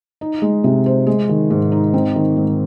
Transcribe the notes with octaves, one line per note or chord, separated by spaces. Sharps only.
D#4
G#3
C3
C5
G#3
D#3
G#2
D#4
C4
D#3
G#2